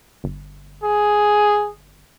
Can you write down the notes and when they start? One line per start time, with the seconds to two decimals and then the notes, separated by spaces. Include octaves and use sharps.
0.24 G1
0.84 G#4